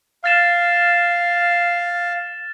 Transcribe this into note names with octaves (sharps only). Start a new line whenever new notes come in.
F5 F6 A6 E7